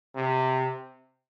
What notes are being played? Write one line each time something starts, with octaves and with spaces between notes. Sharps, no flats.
C3